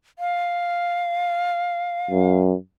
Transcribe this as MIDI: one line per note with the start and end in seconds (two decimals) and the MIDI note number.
0.19 2.37 77
2.11 2.55 42